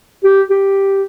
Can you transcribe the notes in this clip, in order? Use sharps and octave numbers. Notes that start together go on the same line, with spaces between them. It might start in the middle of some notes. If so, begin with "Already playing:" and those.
G4
G4